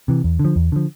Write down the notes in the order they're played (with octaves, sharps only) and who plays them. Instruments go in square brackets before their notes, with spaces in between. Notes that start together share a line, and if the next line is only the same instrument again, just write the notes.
[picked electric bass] C3 E3
E2
D3
F3
E2
D3 F3